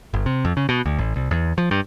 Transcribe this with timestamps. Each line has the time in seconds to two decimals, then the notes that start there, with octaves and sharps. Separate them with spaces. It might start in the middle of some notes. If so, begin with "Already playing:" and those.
0.14 G1
0.26 C3
0.45 F2
0.57 C#3
0.69 B2
0.86 D2
0.99 A1
1.16 C2
1.31 E2
1.58 F3
1.71 G2